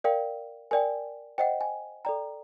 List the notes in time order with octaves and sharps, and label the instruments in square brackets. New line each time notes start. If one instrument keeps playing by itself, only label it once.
[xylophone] A#4 D5 F5 G5
A#4 D5 G5 G#5
C5 D#5 F#5 G5
G#5
A4 D5 G5 A#5